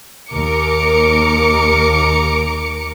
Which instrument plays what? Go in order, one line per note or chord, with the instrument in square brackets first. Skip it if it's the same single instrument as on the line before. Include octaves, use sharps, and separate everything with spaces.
[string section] D#2 A#4 D6 C#7